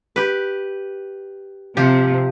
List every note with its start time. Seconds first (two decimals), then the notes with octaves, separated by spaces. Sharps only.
0.16 G4 B4
1.77 C3 F3 G4